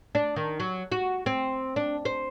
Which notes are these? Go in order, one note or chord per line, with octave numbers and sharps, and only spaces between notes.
D4
D#3
F#3
F#4
C4
D4
C5